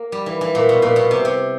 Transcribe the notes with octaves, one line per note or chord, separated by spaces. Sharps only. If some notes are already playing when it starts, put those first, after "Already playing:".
Already playing: A#3
G3
E3
E3
A#2
B2
A#2
B2
C3
C3